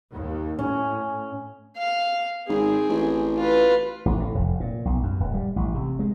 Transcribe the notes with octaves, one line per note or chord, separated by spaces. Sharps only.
D#2
A2 C#4 G#5
F5
G#1 C4 G#4
A1
F4 B4
A1
A2
F1
A#2
B1
F#2
D1
G3
A1
C3
G#3